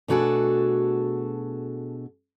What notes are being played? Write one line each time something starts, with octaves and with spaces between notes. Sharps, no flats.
B2 A3 D4 F#4 G#4 A4